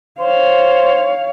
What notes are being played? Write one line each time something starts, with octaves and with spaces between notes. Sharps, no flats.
C5 C#5 F5